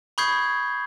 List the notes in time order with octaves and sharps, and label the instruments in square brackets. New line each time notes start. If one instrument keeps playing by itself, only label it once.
[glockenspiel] B5 C#6 D#6 G6 G#6 C7